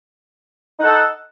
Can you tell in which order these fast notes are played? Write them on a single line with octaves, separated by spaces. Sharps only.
D#4 F#5 A4